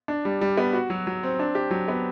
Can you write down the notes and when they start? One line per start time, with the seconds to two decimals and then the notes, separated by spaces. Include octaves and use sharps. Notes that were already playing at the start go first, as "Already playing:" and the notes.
0.08 D4
0.25 G3
0.41 G3
0.57 B3
0.73 F#4
0.90 F#3
1.07 F#3
1.23 C4
1.39 D4
1.55 G4
1.71 F#3
1.88 B3